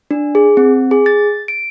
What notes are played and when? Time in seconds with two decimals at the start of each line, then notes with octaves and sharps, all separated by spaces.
0.11 D4
0.35 G#4
0.57 C4
0.91 G#4
1.06 A6
1.48 D7